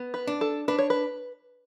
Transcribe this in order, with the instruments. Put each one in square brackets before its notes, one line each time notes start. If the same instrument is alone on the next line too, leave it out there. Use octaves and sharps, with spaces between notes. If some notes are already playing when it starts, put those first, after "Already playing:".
Already playing: [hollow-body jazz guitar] B3
[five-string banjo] B4
[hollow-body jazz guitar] D4
[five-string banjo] A4
[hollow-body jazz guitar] D4 [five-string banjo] B4
[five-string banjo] C#5
B4